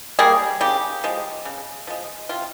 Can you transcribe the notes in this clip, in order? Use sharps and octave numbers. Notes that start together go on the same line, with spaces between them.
G3 A#3 G#4
C#3 G4
F3 G#3
C#3
F3 G#3
C3 F4